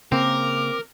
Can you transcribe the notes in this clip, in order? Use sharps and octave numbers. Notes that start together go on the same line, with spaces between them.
C#3 A#3 C4 A#4 D6